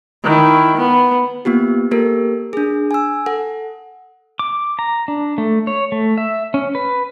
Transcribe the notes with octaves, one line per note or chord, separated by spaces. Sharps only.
D#3 E4
B3
A#3 B3 F4 G4
A#3 G4 A4 A#4
D4 G#4
G#5 E6
A4 F#5
D6
A#5
D4
A3
C#5
A3
E5
C#4
B4